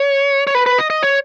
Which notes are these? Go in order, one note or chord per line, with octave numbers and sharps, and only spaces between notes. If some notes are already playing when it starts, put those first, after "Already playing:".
Already playing: C#5
C#5
B4
B4
D#5
D#5
C#5